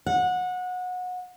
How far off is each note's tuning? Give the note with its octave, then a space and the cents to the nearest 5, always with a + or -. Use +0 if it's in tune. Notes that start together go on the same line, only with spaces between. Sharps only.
F#5 -25